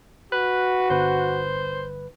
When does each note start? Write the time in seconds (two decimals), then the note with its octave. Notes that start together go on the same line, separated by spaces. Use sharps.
0.32 F#4 B4 F#6
0.90 G1 B4 C5